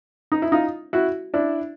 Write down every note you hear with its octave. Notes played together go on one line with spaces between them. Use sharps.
D#4
E4
D#4 F4
E4 F#4
D4 E4